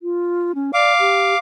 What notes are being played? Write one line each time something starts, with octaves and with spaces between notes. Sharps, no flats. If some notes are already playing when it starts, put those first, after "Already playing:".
F4
C#4
D5 F5 D6
G4